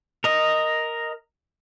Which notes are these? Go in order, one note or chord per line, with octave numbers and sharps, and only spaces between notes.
A#4 D#5